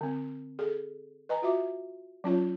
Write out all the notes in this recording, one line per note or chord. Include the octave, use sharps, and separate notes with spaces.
D3 C4
G#4 A4
B4 D#5 G#5 A#5
F4 F#4 E5 D6
F#3 C#4 F4 C#5